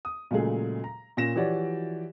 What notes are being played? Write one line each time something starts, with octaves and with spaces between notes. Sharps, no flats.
D#6
A#2 C#3 F#3 G#3 A3 G#4
A#5
A#2 C#4 A#6 E7
E3 F3 F#4 G4 C#5 D5